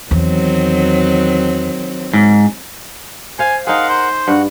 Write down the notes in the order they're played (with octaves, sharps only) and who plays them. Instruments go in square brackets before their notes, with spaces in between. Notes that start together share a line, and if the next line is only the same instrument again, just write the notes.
[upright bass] E2 [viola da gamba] D#3 F#3 C4
[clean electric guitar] G#2
[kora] C5 F5 [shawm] G#5
[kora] D#4 G#4 [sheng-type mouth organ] A#4 F#5 C6 [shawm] F5
[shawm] C5
[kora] G2 [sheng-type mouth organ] F#4 F#5